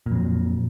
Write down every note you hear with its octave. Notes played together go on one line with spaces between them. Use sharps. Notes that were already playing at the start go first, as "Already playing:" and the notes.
F2 A#2 F#3